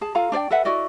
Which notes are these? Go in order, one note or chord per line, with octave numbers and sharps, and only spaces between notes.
G#4 A5
F4 A4 F5 A#5
D4 C5 D5 G5
A4 B4 E5 F#5
E4 F#4 D5 D#5